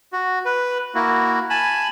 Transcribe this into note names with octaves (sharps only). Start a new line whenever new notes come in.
F#4
B4
A#3 E4 F#4
G#5 A5 B5